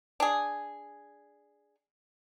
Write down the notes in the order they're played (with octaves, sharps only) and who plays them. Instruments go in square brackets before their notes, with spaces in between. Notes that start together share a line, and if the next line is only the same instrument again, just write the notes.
[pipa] D4 G#4